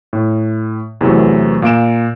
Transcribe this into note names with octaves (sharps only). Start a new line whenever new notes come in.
A2
E2 C3 E3 F#3 A3
A#2 F5 D7 E7